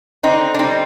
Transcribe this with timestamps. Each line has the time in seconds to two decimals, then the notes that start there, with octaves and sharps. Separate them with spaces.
0.23 D3 C4 D#4
0.54 D4
0.59 G3 C4 D#4